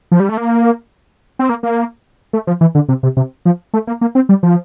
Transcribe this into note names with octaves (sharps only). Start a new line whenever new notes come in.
F3
G3
A3
A#3
C4
A#3
A#3
A3
F3
E3
D3
C3
C3
C3
F3
A3
A#3
A#3
C4
G3
F3